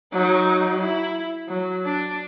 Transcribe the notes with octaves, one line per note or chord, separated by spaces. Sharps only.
F#3 D#4
E4
F#3
D4